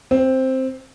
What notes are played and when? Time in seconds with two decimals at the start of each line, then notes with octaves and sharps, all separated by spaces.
0.11 C4